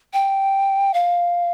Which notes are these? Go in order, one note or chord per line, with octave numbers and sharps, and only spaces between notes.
G5
F5